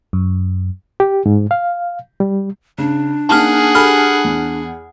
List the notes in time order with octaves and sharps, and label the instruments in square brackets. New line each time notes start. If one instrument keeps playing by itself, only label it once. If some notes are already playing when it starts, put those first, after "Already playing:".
[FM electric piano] F#2
[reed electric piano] G4
G#2
F5
G3
[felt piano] C#3 [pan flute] D4
[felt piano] A#3 C#4 D#4 [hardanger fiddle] G#4 F#5 [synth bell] A5 F6
[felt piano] G4 A4 G#5 [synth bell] B5 F6
[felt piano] E2